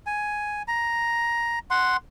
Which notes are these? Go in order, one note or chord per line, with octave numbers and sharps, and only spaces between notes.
G#5
A#5
F#5 C6